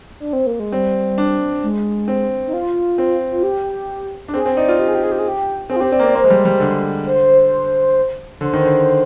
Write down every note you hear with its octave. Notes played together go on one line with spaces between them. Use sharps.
D4
C4
A#3
G#3
G3 C4
D4
G#3
C4
D#4
F4
C4
F4
G4
D4
C4 G#4
C4
D#4 D5
F4
D#4 G4
G#4
G4
G#4
G4
G#4
G4
C4 G#4
F4
C4 G4
C4 D5
A#3
C4 D5
A#3 C5
G#3
G3
G3
D3
C5
D3 C5
D#3
D3